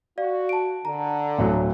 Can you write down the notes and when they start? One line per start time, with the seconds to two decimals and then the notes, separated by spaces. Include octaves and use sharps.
0.18 F#4 D5 F5
0.49 A5 D7
0.85 D3 A#5
1.39 D1 A2 F#3